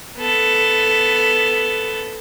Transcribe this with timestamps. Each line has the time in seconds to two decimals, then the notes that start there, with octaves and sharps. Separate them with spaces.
0.18 B3 A4